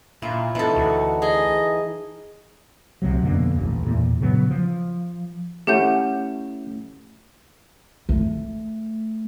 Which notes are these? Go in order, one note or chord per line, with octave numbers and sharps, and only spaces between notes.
A#2 E4 F4
B2 E3 D#4 E4 A4
D2 F#4
G#4 D#5
C2 C3 F#3
F2 B2 D3 A#3
D#1 A1
E2 A#2
A#2 C#3 F#3 B3
F3
A3 C#4 E4 G4 F#5 G6
A3